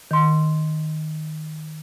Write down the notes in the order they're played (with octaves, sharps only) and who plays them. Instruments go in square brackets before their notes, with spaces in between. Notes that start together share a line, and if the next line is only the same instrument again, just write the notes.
[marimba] D#3 C6